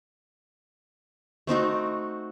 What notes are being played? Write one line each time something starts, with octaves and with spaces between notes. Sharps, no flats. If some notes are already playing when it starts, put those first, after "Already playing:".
A3 C4 D#4 F#4